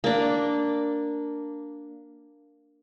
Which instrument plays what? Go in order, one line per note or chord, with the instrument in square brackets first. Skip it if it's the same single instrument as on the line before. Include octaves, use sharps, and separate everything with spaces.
[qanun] A#3 D4